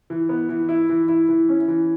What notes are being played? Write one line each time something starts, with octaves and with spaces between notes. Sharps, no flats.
E3
B3
E3
E4
E3
E4
E3
C#4
E3